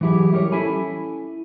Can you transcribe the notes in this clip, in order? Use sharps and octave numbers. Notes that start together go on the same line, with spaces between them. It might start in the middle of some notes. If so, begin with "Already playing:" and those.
E3 F#3 E4 G4 G#4
G3 G4 A#4 C5 C#5
C#4 E4 A4 E5 G#5 B5